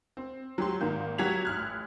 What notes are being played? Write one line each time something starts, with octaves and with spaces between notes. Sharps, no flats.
C4
F#3 G4 C6
G#1 D#3 A#3 G6
F#3 F#4 G4 G#6 B6 F7
A1 F6 F#6